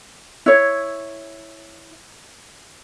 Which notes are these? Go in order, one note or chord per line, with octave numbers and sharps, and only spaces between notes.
E4 C#5